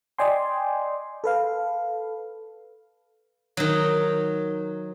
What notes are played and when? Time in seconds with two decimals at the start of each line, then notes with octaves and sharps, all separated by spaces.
0.18 D5 D#5 G5 G#5 C6
1.24 A4 B4 F5
3.57 D#3 F#3